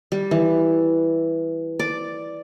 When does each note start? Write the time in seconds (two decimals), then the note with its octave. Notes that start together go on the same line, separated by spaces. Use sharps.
0.12 G3
0.31 E3
1.79 D5